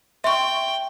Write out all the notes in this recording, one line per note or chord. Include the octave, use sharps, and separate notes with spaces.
E5 G5 C6 C#6